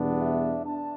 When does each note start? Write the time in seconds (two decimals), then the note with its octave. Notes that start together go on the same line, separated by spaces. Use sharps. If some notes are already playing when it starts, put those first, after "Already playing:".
Already playing: E2 B2 G3 B3 D4
0.20 E5
0.65 D4 A5